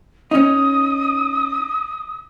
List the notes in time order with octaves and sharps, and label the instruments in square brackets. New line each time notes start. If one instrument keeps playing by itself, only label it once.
[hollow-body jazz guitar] C#4 D#4 [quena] D#6